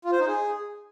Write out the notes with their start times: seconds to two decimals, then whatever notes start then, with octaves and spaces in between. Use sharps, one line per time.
0.05 F4
0.12 C5
0.20 D#4
0.27 G#4